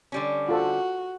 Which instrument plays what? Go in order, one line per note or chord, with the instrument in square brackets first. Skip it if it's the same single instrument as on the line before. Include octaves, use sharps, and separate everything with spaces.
[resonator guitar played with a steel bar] D3 G3 C#4
[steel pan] F4 A4 C5 [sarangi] F#4